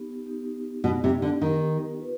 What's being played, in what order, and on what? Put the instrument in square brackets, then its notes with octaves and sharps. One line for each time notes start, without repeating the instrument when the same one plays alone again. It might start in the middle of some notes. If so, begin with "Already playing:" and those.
Already playing: [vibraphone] B3 D#4 G4
B3 D#4 G4
[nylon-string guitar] B2 [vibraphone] B3 D#4 G4
[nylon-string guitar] C3
D3
[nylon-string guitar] D#3 [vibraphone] B3 D#4 G4
[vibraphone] F4 B4